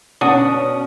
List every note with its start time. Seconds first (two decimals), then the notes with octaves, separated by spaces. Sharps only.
0.21 B2 C#4 D4 F#4 D#6